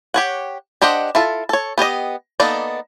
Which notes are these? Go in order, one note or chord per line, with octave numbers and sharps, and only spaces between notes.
G4 C#5 F#5
D4 G4 C5 D#5 F#5
E4 F4 A4
A4 C#5
B3 G4 D5 D#5
A#3 B3 D#4 A4 D5